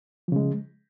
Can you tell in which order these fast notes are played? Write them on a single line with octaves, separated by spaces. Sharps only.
F3 C#3 G#3